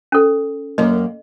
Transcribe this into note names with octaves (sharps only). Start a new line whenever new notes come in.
C#4 A4
F#2 A#3 D#5